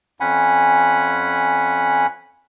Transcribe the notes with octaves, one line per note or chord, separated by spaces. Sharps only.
F2 C#4 F#5 G#5 B5